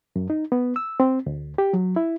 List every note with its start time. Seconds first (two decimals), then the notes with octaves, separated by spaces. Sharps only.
0.16 F#2
0.30 D#4
0.52 B3
0.76 E6
1.00 C4
1.26 D2
1.58 G4
1.73 F#3
1.96 E4